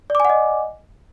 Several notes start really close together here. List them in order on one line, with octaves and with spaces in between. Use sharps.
D5 D6 G#5 F#5 D#5